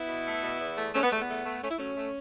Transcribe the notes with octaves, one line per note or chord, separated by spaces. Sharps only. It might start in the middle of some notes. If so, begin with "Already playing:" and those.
Already playing: B3 E4
B2
A3
B2
E2
A3
E2 A3 C#4
B3
E2 A3
B3
A3
A3
A3 C#4
E4
F#3 A3 C#4
A3